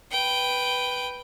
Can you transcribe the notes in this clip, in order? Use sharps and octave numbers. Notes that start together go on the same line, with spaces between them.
B4 G5